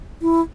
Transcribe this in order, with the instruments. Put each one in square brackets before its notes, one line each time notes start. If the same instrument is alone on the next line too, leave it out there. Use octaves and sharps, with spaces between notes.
[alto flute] E4